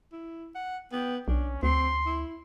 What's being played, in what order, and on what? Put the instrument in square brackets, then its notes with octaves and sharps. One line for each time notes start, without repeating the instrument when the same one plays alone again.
[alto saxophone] E4
F#5
[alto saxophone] B3 [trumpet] G5
[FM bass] B1 [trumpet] C#4 [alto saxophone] D4
[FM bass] D2 [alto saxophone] C4 [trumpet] C6
[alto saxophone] E4